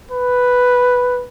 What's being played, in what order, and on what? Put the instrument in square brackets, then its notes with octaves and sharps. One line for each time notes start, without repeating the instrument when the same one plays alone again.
[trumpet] B4